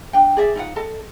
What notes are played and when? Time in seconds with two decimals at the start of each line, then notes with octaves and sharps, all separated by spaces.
0.13 D4 G5
0.37 G#4 D5 E5
0.55 D#4 F4 F#5
0.76 A4 D#5 A5